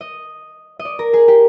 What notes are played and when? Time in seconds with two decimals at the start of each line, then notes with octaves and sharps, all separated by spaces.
0.01 D#5
0.79 D#5
0.85 D5
0.99 A#4
1.13 G#4
1.28 G4